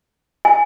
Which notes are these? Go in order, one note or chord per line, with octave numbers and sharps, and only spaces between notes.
G#5